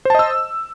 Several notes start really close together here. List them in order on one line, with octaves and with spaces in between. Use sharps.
C5 A5 D#5 E6